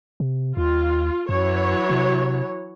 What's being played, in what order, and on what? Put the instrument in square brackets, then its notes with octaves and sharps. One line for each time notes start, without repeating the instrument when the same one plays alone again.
[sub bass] C3
[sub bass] D#2 [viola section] F4
[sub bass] F#2 [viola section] E3 F#3 C#5
[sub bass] C3